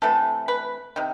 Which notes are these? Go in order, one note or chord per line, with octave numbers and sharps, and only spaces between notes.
C3 E3 A3 A4
B4
C3 D#3